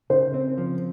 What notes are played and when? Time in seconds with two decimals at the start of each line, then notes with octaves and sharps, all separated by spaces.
0.10 C#3 C5
0.34 C4
0.58 F3